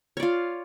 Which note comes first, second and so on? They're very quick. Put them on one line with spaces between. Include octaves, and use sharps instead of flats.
C#5 D5 F4